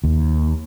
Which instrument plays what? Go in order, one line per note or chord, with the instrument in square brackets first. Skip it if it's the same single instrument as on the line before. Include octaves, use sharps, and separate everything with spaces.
[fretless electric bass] D#2